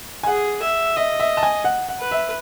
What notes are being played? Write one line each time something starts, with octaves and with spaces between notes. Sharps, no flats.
G#5
G#4 F#5
E5
D#5 E5
E5
A5
G#5
F#5
F#5
B4
E5